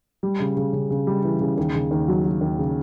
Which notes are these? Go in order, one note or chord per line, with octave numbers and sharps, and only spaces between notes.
G3
C#3
C#3
C#3
C#3
G3
E3
C#3
D#2
C#3
D#2
F#3
F#3
D#2
C#3